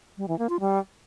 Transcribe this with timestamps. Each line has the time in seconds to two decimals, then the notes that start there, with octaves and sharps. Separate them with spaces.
0.18 G3
0.28 E3
0.39 A#3
0.49 F4
0.60 G3